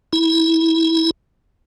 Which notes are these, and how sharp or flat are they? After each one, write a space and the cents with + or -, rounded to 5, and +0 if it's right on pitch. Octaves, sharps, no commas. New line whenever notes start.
E4 -20